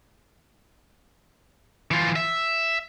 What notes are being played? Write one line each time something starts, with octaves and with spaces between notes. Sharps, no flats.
E3 F4
E5